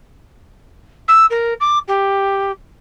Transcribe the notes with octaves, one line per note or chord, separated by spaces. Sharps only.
E6
A#4
D6
G4